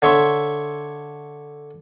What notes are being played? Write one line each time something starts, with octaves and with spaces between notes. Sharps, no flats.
D3 C#5 E5 C6 C#6